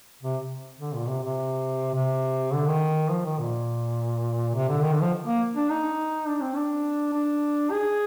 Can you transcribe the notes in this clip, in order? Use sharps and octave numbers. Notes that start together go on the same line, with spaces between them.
C3
D3
A#2
C3
C3
C3
D3
D#3
F3
D#3
A#2
C3
D3
D#3
D3
F3
A#3
D4
D#4
D4
C4
D4
D4
G#4